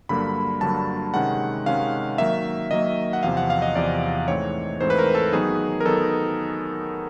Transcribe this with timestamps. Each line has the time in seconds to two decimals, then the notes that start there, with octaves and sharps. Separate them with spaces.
0.09 G2 D3 F#3 A#3 B5
0.61 G2 D3 F#3 A#3 A5
1.14 C3 D#3 G#3 C#4 F#5
1.66 C3 D#3 G#3 C#4 F5
2.18 D#3 F#3 A#3 E5
2.71 D#3 F#3 A#3 D#5
3.13 F#5
3.23 E2 C3 F3 F5
3.37 F#5
3.50 F5
3.62 D#5
3.75 E2 C3 F3 D5
4.28 G#2 E3 A3 C4 C#5
4.81 G#2 E3 A3 C4 C5
4.90 B4
4.98 A#4
5.15 A4
5.32 D#3 F#3 B3 D#4 G#4
5.81 A#4
5.85 D#3 F#3 B3 D#4 A4